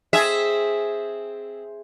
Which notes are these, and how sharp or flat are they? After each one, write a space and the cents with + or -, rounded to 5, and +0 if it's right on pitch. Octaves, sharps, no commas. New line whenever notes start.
C4 +0 G#4 +0 E5 +0